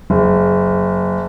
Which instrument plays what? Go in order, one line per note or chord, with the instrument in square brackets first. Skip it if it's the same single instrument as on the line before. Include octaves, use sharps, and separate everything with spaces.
[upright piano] F#1